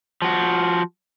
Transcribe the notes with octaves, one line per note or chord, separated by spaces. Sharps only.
F3 F#4